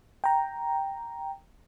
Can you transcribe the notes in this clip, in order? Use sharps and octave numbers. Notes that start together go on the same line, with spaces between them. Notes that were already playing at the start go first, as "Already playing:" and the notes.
G5 A#5